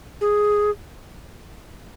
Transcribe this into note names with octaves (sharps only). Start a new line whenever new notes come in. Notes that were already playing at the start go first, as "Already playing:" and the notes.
G#4